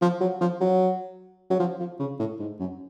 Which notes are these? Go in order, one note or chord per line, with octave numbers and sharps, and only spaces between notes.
F3
F#3
F3
F#3
F#3
F3
F3
C#3
A2
G#2
F#2